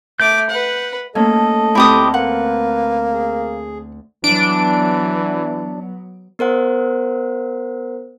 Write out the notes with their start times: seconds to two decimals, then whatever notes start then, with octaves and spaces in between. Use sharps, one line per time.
0.20 A3 D6 G6
0.50 B4 F#5
1.15 A3 A#3 C#4 A4 D#5
1.75 D2 A3 C4 E4 G4 D#6
2.14 A#3 B4 F#5
3.13 G#4
4.24 E3 F#3 B3 D4 D7
6.39 B3 A#4 C5 F#5